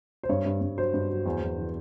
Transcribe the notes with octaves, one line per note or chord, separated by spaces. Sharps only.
C5
G2 C#5
G2
G2
F#3 C5
G2
F#3
E2
E2
E3